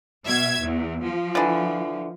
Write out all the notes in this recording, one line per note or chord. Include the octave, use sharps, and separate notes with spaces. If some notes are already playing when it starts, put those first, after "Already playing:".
B2 E5 G#6
E2
F3
D3 E3